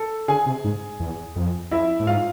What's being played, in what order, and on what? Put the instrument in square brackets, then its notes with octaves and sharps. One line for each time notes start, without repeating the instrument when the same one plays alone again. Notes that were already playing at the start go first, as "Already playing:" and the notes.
Already playing: [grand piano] A4
[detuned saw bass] D3 [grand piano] G#4 G#5
[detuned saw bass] C3
G#2
E2
F2
[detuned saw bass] F2 [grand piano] E4 E5
[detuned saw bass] A2
[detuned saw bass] G#2 [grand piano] F4 F5